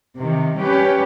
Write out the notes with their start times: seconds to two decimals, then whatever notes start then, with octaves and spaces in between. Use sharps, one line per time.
0.17 C3 D#3
0.58 G3 C#4 G4 B4